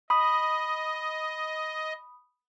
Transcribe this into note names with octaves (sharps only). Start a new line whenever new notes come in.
D#5 B5 D#6